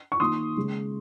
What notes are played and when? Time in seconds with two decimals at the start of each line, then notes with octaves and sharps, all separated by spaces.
0.12 C#6
0.20 D#3 A#3 C6 D#6
0.57 C#3 G#3